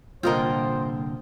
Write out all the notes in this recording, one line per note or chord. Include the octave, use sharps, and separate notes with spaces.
C2 A#2 D3 F4 A#4 C5 D#5 G5